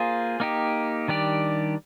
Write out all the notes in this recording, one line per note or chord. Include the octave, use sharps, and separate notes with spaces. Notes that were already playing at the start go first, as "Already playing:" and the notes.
Already playing: A#3 F4 G#4 C5
A#3 D#4 G4
D#3 G3 D4 G4 D5